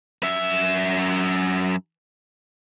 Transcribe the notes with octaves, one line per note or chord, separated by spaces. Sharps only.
F#2 E5